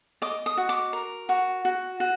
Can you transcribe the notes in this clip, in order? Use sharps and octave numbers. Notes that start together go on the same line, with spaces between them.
D#5 D6
D#6
F#4
D6
A#4
F#4
F#4
F#4